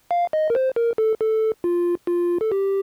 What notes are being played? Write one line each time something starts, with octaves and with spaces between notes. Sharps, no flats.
F5
D#5
A#4
C5
A#4
A4
A4
F4
F4
A4
G4